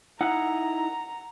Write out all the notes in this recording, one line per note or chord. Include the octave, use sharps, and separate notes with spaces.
D#4 E4 F#5 A#5